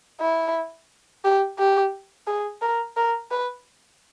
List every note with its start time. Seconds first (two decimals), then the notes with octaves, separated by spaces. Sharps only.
0.20 E4
1.24 G4
1.59 G4
2.27 G#4
2.62 A#4
2.97 A#4
3.31 B4